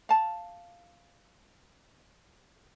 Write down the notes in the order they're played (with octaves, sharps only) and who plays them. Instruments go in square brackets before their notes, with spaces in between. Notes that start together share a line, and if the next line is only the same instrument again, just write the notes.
[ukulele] F5 A5